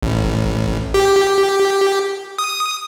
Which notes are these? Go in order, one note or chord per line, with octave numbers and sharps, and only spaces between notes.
A1
G4
D#6